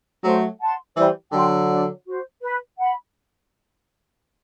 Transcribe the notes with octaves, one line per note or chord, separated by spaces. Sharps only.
F#3 A3 C5
F#5 A5 C6
E3 G3 C5
D3 F#3 G5 C6
D4
F#4 C5
B4
F#5 B5